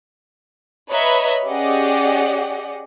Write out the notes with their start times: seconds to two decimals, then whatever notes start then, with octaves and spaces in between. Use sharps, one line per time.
0.90 B4 C#5 D#5 E5 A#5 B5
1.48 C#4 G4 G#4 D5 D#5 F#5